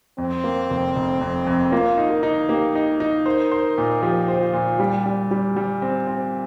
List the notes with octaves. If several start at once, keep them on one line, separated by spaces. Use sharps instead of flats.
F2 C4
A#3
F1
F1
F2
F2
A#3 F4
D#4
A#4
D#4
A#3 G4
D#4
D#4
A#4 C5
C5
A#2
F3 G4
C5
F4
A#2
G3 G4
G3
G3
G3
C4
C4